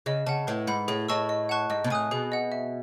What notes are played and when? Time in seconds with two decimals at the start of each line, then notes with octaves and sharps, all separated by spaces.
0.06 C#3 D#5
0.26 C#3 F#5 A5
0.47 A2 B4
0.67 G#2 F#5 B5
0.88 A2 G#4
1.08 A2 D#5 A5 C#6 E6
1.29 D#5
1.49 F#5 A5 C#6 F#6
1.70 G#2 D#5
1.84 B2
1.90 A2 G#5 D#6 F#6
2.11 B2 G#4
2.32 D#5 F#5
2.52 E5